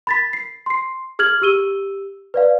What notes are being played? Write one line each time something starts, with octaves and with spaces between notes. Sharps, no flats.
B5 A6 B6
C7
C6 C7
G#4 F6 G#6 F#7
G4 E6 D#7 G7
B4 D5 F5